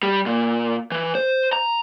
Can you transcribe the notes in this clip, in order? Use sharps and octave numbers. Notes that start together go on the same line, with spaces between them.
G3
A#2
E3
C5
A#5